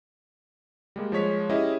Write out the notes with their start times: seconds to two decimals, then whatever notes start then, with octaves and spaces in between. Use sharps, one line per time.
0.96 G3 G#3 A#3
1.12 F3 G#3 C#5 B6
1.49 C#4 E4 G4 G#4 D#5